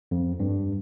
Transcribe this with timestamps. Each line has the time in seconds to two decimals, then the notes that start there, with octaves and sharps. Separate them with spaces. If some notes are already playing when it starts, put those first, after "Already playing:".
0.11 F2
0.40 G2